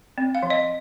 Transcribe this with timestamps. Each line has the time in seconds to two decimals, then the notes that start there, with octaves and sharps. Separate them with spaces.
0.18 C4
0.35 F5
0.43 F3
0.50 D#5